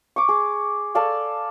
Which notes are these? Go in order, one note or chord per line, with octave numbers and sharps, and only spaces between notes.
C#6 D6
G#4
A4 D5 F5 G#5